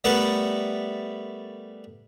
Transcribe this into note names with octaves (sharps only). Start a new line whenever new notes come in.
G3 A3 B3 A#4 B4